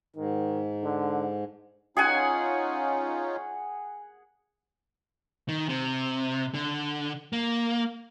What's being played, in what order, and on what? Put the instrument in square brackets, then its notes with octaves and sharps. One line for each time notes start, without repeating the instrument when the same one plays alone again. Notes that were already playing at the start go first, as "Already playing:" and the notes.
[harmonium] G#2 [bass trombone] D#3
[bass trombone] D3
[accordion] C#4 D#4 F4 [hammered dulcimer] G#4 F#5 G#5
[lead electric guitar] D#3
C3
D3
A#3